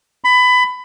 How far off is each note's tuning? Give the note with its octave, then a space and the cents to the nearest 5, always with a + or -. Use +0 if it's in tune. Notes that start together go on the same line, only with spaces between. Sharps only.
B5 +20